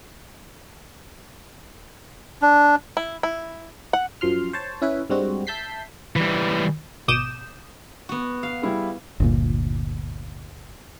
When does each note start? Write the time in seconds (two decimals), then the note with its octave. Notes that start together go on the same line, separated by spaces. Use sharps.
2.42 D4
2.97 E4
3.23 E4
3.93 F#5
4.21 F#2 F3 C6 F6
4.53 C5 C#5 A5
4.82 C#4 E4 B4
5.10 G2 G3 G#3 C4 F#4
5.47 E5 A5 G6 B6 C7
6.16 E3 G3
7.08 G#1 B2 D6 D#6 G6 E7
8.09 B3 F#4
8.43 F5
8.62 G3 E4 G#4
9.20 G1 D2 A#2